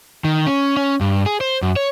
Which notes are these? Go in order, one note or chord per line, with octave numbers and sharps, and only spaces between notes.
D#3
C#4
C#4
G2
G#4
C5
F#2
C#5